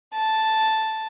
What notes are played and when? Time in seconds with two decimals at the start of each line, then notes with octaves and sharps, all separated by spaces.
0.13 A5